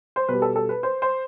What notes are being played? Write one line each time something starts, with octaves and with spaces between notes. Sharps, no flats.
C5
B2 G3 B4
A4
A4
B4
C5
C5